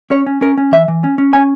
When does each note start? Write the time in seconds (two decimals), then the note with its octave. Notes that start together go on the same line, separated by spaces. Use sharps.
0.10 C#4 C#5
0.26 C#4
0.41 C#4 A#4
0.58 C#4
0.72 E3 E5
0.88 E3
1.04 C#4
1.18 C#4
1.33 C#4 G#5